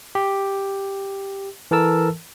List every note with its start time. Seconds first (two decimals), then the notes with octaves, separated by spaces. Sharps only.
0.15 G4
1.71 E3 A4 A#4 A5 E6